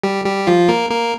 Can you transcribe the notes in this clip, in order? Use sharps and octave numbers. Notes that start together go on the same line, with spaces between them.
G3 G4
G3 G4
F3 F4
A#3 A#4
A#3 A#4